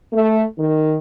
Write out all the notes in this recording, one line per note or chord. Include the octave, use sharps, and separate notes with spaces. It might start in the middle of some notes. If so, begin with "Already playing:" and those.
A3
D#3